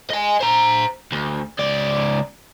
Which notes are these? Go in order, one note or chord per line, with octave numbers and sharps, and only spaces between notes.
D#5 G#5
C5 A#5
D2
C#2 D5